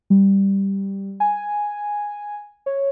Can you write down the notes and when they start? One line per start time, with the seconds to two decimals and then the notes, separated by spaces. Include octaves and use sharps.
0.10 G3
1.20 G#5
2.66 C#5